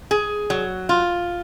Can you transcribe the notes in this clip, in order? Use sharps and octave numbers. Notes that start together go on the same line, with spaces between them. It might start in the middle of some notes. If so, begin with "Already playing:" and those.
G#4
F#3
F4